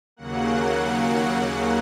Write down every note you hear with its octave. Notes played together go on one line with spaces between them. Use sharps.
D#2 C#3 F#3 A#3 F#5